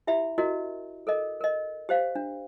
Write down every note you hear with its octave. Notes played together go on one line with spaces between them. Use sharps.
E4 G4 E5 B5
E4 F#4 A#4 D#5
A4 A#4 D#5
A#4 D#5
G4 C5 F5
D4